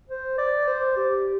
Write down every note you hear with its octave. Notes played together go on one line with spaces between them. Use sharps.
C5
D5
C5
G4